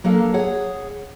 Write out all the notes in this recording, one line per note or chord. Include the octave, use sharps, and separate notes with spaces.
F#3 A#3 D4 A4 F5
G#4 C#5 F#5